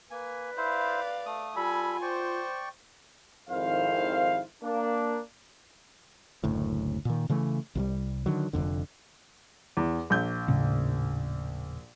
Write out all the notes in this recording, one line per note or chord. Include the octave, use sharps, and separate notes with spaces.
A#3 B4 G#5
E4 C5 D5 F5
A3 D#6
G3 F4 A4 G#5 B5
C5 D5 G5 C#6
G#1 F2 D#3 E4 C5 F5
A#3 D4
F#1 D2 A2
A#2 D#3
C#3 E3 A3
C2 F3 G3
D3 D#3 F#3
F1 A#1 F2 D3
E2
A#1 G6
D#1 A2 C#3